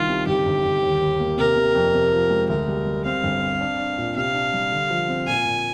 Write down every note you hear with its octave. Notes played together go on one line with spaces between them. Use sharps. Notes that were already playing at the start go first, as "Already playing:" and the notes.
Already playing: C2 D#3 F4
C3
G1 G4
G1
G1
D#2
D#2
A#3
C3 A#4
C3
F2
C3
F3
G#3
D2 A#4
G3
G3
C4 F5
G1
C4
D4
D4
A#2
C3 F5
D4
G3
D3
F3
C4
A#2 G#5
A#2